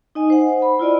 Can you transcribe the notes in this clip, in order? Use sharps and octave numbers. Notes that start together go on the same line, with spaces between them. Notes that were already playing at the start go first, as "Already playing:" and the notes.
D#4 D#5 G#5
C5 F#5
B5
E4 F4 D5 D#5